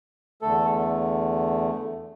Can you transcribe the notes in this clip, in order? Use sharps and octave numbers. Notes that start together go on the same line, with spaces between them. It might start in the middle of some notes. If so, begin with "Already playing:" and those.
E2 D3 A3 A4